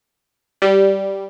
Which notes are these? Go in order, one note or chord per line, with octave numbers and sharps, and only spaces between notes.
G3